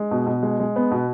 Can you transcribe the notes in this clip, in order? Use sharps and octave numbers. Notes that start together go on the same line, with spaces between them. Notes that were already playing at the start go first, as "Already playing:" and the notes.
Already playing: G#3
B2
B2
G#3
G#3
B3
B2